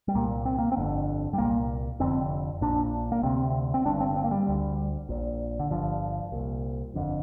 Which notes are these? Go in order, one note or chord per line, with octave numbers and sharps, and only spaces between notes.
G3
C2 A#2 A#3
C4
A#3
C4
G1 F2 D3
G3
C2 A#2 A#3
F1 F2 D3 C4
A#1 A#2 D4
A#3
D2 C3 C4
C4
G1 G2 D3 D4
C4
C4
A#3
G3
D2 D3
A#1 A#2
D3
G1 G2 D3 F3
C2 A#2
G1 F2 D3